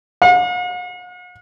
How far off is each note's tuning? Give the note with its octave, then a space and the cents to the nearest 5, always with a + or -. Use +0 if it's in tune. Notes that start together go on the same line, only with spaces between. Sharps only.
F#5 -45